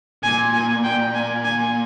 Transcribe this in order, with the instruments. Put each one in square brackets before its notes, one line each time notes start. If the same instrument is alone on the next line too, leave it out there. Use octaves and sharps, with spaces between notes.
[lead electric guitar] A#2 [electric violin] G#5
[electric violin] G#5
G5
G#5
G#5